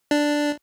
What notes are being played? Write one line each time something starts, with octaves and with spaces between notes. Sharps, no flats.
D4